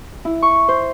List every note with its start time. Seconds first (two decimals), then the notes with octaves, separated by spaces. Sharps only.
0.25 E4
0.42 C#6
0.68 C5